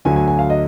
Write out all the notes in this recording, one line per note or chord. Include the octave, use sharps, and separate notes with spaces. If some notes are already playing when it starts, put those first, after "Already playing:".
D2 D3 F#3 G#5
G#5
G#5
F5
D#5